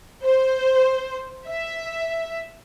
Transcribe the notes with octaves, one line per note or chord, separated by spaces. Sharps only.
C5
E5